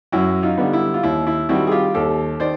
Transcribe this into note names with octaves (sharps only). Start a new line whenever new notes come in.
F#2 E4 F#4
D#4 F4
D3 G3 B3
E4
F4
D#2 E4
E4
D#3 G3 C4 E4 F#4
G#4
F4 G4
D#2 G4 A4
D#3 C5 D5